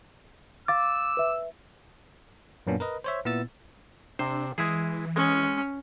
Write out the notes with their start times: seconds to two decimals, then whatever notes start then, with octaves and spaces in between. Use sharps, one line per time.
0.68 F5 D6 E6 A6
1.17 B4 E5
2.67 F#2 A#2 A#3 B3 C#4 D4
2.80 A#4 B4 D#5
3.04 C5 C#5 E5
3.25 A#2 B3 E4 E6 A6
4.19 C3 D4 C5
4.58 E3 G#3 E4 G#4
5.16 G#3 C#4